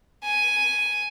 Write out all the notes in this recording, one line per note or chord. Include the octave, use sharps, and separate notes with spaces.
G#5